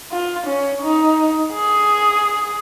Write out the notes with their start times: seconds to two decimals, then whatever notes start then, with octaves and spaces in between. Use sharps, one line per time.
0.12 F4
0.47 C#4
0.83 D#4
1.54 G#4